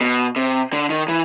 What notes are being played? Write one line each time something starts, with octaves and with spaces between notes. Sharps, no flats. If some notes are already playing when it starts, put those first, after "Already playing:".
B2
C3
D3
D#3
E3